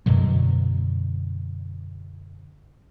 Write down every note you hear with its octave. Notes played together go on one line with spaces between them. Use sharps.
F#2 B2 D3 F#3